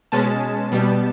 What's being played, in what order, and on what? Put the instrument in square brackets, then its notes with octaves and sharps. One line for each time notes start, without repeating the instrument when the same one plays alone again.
[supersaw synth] B2 G#3 C#4 A5
B2 G3 B3